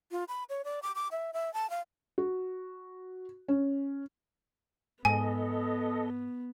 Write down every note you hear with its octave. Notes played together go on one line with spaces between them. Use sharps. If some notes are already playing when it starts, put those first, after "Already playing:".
F4
B5
C#5
D5
D6
D6
E5
E5
A5
F5
F#4
C#4
G#2 B3 A4 D#5 G#5